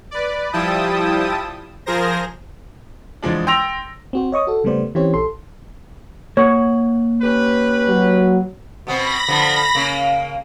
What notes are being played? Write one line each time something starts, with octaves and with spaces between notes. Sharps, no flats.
B4 D5
F3 G3 E4 G5 A5 D#6
F3 G#4 A#4 C5 A#6
E2 F3 G#3 D4
G5 C6 E6 A#6 F7
C4 F#4 C5
C#5 D#5 C#6 D#6
F#4 A4
C#3 G3 A3 B3 C5 D5
E3 C4 C#4 G4 C5 C#5
A#1 A4 C6
A#3 C#5 F#5
C#4 G4 B4
F#3
B2 B3 C4 B5 A#6
D3 F3 B3
C#3 A#3